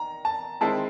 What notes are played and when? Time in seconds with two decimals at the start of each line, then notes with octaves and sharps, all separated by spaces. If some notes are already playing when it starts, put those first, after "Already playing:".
Already playing: D#3 A#5
0.25 A5
0.61 D#3 G#3 C4 E4 A5